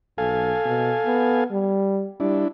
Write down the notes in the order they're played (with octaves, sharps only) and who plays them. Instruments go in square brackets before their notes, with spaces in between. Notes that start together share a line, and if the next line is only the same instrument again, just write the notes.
[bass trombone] B1 [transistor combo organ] A4 F5 G#5
[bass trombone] B2
B3
G3
[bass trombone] G3 [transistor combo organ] D4 E4